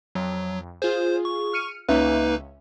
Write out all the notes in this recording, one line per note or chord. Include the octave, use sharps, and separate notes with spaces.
F2 F#3
F4 G#4 C5
C#6
F6 C#7 D#7
C#2 A#3 C#4 D#4 B4 E5